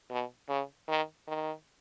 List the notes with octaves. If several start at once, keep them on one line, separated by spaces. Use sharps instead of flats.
B2
C#3
D#3
D#3